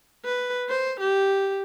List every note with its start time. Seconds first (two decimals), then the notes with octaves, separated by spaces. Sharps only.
0.25 B4
0.69 C5
1.00 G4